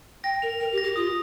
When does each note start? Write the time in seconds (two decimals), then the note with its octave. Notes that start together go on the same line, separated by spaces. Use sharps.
0.24 G5 A#6
0.42 A#4 F7
0.60 A#4 F7
0.72 G4
0.78 A#6
0.84 G4
0.96 F4 D#6